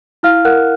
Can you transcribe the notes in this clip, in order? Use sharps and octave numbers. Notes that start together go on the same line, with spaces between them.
E4 F5 F6
A#4 F#5 F#6